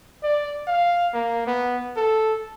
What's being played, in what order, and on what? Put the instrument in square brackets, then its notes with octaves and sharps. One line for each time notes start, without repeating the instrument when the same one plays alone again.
[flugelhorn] D5
F5
A#3
B3
A4